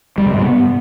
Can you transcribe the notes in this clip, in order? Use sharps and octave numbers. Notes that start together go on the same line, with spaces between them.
G3
C3
G#2
B3